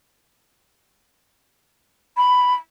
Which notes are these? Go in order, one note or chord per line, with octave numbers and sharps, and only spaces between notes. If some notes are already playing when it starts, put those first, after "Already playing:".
B5